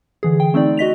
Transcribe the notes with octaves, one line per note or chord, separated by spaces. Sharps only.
D3 E3 G#4
G5
A3 C4 D#4 D5
F#4 D#5 B6 F7